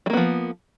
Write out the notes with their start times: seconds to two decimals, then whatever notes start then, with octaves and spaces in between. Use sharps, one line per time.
0.06 G3
0.10 A#3
0.13 B3
0.17 F3